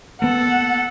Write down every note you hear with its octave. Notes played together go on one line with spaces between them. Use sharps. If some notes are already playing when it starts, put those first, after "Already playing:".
A#3 B3 A4 F#5